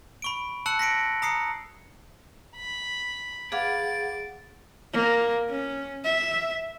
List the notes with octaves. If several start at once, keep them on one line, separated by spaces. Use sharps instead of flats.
B5 C#6 D7
A5 E6 F#6 C#7 F#7
A#6 B6 C#7 D7
A#5 D#6 C7 C#7
B5
G#4 B4 D5 F5 F#5 A6 D7
A#3
C#4
E5